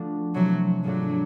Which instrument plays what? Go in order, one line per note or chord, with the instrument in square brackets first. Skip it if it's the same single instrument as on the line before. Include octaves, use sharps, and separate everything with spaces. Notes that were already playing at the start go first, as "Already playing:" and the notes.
Already playing: [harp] F3 A3 D4 F#4
[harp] C3 E3 A3 [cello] F#3
[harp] G#2 F3 A3 D4 [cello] F#3